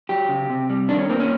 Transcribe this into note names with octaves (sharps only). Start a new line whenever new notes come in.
F#3 G4
C#3
C3
G3
D#3 D4
C#4
A#3 C4
C#4